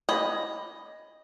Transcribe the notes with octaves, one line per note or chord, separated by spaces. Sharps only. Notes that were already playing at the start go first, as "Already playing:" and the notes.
C#4 D#5 B5